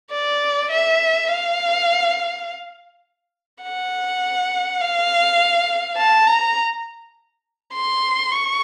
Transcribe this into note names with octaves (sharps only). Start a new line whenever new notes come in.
D5
E5
F5
F#5
F5
A5
A#5
C6
C#6